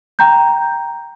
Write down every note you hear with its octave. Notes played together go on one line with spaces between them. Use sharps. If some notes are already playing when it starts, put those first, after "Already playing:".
G5 A#5 G6